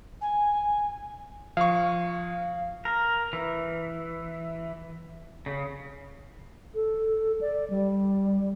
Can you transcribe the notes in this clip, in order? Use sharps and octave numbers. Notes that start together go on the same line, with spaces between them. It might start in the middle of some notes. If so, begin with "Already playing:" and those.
G#5
F3 F5 C#6
A#4
E3
C#3
A4
D5
G3